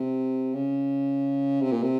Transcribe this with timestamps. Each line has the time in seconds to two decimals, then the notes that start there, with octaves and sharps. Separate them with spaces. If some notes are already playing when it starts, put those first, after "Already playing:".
Already playing: C3
0.54 C#3
1.62 C3
1.72 A#2
1.83 C3